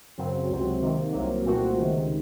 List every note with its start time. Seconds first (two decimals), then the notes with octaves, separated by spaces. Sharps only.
0.18 F#2 C#3 F#3 C4
0.50 C#2 C3 F#3 C4
0.81 C3 D#3 A#3
1.12 C2 C3 F#3 A#3
1.43 C2 A#2 A3 C4 F#4
1.76 C#2 C3 D#3